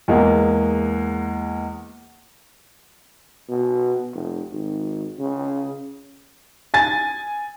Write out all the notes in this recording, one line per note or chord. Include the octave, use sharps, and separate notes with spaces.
E2 G#3 A#3
B2
F1
G#1
C#3
G#5 A6